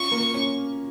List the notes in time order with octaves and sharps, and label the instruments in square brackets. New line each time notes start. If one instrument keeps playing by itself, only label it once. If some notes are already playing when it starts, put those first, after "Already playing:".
Already playing: [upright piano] C#4 F4 [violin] C#6
[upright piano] A#3
C#4